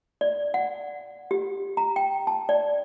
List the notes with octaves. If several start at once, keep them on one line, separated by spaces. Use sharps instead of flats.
D5
F#5
G4
A#5
G5
A5
D5